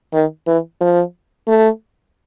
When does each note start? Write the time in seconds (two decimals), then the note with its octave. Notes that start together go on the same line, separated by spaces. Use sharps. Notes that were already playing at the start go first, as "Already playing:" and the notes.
0.14 D#3
0.47 E3
0.81 F3
1.48 A3